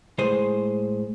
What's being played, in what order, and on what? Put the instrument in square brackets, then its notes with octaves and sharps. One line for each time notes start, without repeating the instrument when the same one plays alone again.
[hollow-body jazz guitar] A2 G#3 G#4 C5